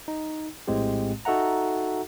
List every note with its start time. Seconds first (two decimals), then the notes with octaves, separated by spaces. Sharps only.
0.08 D#4
0.67 A#1 A2 G#3 C4 G4
1.25 D#4 F#4 A4 E5 F#5 A#5